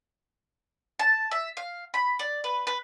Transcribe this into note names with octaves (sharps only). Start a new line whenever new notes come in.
A5
E5
F5
B5
D5
B4
B4